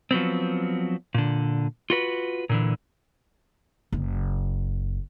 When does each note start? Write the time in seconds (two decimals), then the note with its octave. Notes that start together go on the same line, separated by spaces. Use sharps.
0.11 F3 F#3 B3 C4
1.14 A#2 D3
1.90 F4 F#4 B4
2.49 A#2 D3 E3
3.92 F#1